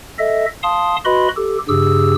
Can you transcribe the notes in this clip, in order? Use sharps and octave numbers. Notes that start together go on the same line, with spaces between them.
A4 D#5 E5
F5 A5 C6 D#6
F#4 B4 D#5 B5 C6
G4 A4
G2 C#3 G4 G#4 E6